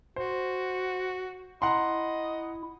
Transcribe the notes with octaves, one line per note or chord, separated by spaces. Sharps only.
F#4 C5
E4 D#5 F#5 A#5 C6